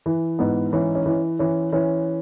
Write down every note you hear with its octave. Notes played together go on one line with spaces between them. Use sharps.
E3
G#2 B3
E3 C#4
C#4
E3
E3 C#4
E3 C#4